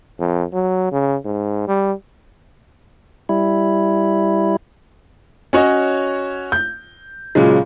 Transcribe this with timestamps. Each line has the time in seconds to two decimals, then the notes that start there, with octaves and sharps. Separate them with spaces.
0.19 F2
0.53 F#3
0.92 C#3
1.25 G#2
1.68 G3
3.29 G3 E4
5.53 C#4 F#4 C#5 D#5
6.52 G6
7.35 A#2 C#3 F#3 G#3